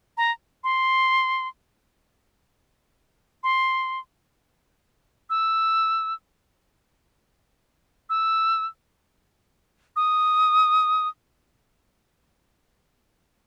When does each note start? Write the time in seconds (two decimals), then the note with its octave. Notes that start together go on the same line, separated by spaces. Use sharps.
0.17 A#5
0.64 C6
3.44 C6
5.30 E6
8.10 E6
9.96 D#6